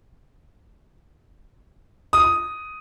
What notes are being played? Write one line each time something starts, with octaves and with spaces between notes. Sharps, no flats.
D#6